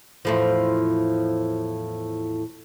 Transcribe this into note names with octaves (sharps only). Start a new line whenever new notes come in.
E2 A2 F3